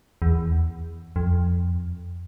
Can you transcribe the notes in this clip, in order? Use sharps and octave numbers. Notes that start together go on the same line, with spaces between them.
E2
F2